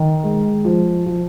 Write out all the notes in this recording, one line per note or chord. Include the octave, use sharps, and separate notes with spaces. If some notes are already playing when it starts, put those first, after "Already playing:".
Already playing: D#3
G#3
F3
F3